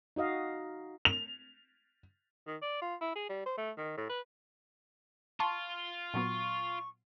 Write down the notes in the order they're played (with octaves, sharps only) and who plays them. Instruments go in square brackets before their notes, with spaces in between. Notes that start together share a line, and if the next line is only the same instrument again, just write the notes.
[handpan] D#4 F#4 D#5 F5
[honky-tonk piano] F7
[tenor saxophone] D#3
D5
F4
E4
G#4
G3
C5
A3
D#3
A2
B4
[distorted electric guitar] F4 [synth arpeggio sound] A5 C6 C#6
[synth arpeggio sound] A#2 F#3 B3 [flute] C#6